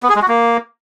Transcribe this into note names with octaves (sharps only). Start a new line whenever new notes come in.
B3
G#4
G#3
F#4
A#3